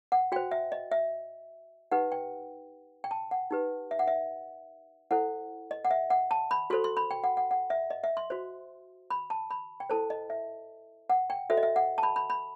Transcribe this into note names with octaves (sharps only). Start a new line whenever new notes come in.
F#5
F#4 C5 G5
E5
D#5
E5
D#4 G4 B4 F#5
G5
G5
A5
F#5
D#4 G4 B4
E5
F#5
E5
E4 A4 C5 F#5
D#5
F#5
E5
F#5
A5
B5
F#4 A4 C5 C6
C6
B5
G5
F#5
F#5
F#5
E5
D#5
E5
C6
F#4 C5
B5
A5
B5
G5
E4 A4 C5 A5
D#5
E5
F#5
G5
F#4 A4 C5 E5
D#5
E5
F#5
A5
B5
B5
B5